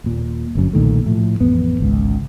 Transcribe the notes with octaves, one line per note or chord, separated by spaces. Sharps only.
D#1 A#2
G1 F#2
B1 A#2 D#3 A3
A2 F3
A1 F2 B3
G#1 C#2